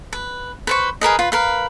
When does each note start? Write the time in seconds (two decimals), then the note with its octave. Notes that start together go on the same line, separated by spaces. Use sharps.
0.13 B4
0.67 B4 C5 C#6
1.01 G#4 A#4 B4 D#5
1.19 F4 B4
1.32 A#4 B4 F5